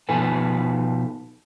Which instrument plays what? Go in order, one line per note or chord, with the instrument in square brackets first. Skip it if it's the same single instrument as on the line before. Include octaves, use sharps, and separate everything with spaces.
[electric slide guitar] B2 F3 D#4 A4 B4 G#5